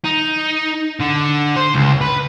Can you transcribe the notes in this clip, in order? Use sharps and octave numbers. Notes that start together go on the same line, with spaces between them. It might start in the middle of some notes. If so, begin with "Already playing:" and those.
D#4
D3
C5
C#2
B4